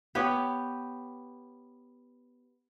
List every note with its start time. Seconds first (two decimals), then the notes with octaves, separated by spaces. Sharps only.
0.15 B3 G4 C#5